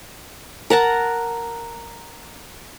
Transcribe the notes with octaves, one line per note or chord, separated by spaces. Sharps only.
A#4 F#5 A5 A#5